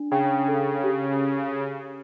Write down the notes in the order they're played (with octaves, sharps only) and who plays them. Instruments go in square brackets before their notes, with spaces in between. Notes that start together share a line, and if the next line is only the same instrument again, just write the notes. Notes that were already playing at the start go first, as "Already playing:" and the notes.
Already playing: [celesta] D4
[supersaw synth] C#3 [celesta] G5
[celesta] A4
G4